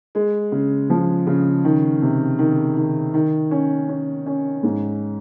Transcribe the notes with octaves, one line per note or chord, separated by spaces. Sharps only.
G#3
C#3
F3
C#3
D#3
C3
D#3
D#3
D#3
C#4
C#4
C#4
G#2